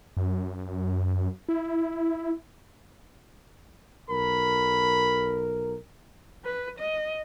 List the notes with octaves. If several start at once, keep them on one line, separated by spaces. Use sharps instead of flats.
F#2
E4
B1 A#4 B5
B4
D#5